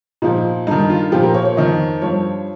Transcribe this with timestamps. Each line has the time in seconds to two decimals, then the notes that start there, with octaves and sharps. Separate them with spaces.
0.22 A#2 F3 D#4
0.67 G2 D#3 D#4
0.90 F4
1.12 A#2 F3 G4
1.23 A#4
1.34 C#5
1.45 C#5
1.57 F2 D#3 D#5
2.02 G2 F3 C#5